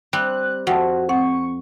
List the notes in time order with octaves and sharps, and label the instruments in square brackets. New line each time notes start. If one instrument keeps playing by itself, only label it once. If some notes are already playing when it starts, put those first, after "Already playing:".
[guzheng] G3 C4 [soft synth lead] F#6
[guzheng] F2 [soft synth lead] F#4 [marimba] F#5 G5 A5
[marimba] C4 F#5 [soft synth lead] C#6